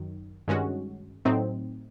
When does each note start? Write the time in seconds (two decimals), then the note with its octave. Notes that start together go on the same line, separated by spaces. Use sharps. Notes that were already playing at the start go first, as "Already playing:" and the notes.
Already playing: F#2 D#3 F#3
0.48 G2 D#3 G#3 C#4 F#4
1.25 A2 F#3 A3 C4 D#4